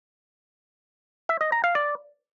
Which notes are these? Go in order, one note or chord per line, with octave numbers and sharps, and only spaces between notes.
E5
D#5
A#5
F5
D5